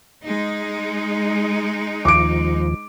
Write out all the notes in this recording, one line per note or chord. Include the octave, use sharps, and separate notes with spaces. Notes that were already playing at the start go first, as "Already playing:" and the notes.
G#3 D#4
D#2 F3 D6 D7